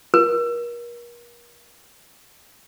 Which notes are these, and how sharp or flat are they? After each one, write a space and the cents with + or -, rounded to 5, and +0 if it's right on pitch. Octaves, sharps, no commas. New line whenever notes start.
A#4 +40